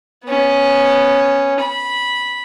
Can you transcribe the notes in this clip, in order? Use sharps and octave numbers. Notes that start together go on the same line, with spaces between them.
B3 C#4
B5